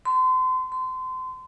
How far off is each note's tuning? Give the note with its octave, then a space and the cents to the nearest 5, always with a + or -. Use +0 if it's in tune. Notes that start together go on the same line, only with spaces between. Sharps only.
C6 -35
C6 -30